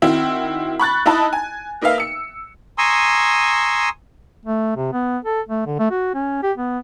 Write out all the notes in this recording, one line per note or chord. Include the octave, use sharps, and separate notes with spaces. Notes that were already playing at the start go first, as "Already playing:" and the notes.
D#3 C4 E4 F#4
B5 C#6 F#6 A6
D#4 E4 D#5 A5 B5
G#5
A#3 D#4 B4 E5 F5
E6 C#7
G#5 A#5 C6 C#6 D#6 E6
A3
C3
B3
A4
A3
D3
A3
F#4
C#4
G4
B3